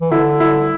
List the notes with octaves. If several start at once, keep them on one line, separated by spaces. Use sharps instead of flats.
E3
D3 E4
E4